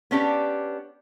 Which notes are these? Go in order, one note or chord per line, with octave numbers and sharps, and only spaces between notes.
B3 C#4 D4 G4